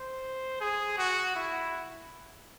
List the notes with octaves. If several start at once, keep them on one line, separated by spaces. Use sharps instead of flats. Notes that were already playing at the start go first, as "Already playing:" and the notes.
Already playing: C5
G#4
F#4
E4